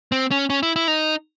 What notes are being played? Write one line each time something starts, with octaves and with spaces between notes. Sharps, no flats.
C4
C#4
C#4
E4
E4
D#4